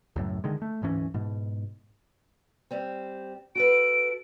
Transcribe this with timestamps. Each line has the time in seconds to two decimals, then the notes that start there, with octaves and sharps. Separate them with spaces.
0.16 C#2 F#2 A2
0.44 D3 D#3 G#3
0.62 A3
0.82 D1 G#2 E3 C#4
1.14 G#2 B2
2.71 G3 C4
3.55 F#4 A4 B4 D7